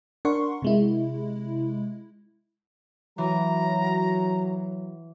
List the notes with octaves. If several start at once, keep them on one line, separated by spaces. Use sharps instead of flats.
D4 A#4 F#5 C6 C#6
C3 G#3 E4
E3 F#3 A#5